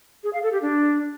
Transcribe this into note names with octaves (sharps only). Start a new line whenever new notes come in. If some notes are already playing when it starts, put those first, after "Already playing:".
G#4
F5
A4
G4
D4